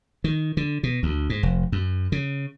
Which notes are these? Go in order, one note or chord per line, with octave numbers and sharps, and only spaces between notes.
D#3
D3
B2
D2
G#2
F1
F#2
C#3